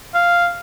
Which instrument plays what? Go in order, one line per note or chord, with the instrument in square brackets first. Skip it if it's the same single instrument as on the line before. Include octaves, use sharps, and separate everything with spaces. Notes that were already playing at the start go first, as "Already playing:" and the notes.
[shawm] F5